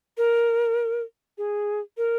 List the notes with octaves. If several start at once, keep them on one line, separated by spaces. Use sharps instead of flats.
A#4
G#4
A#4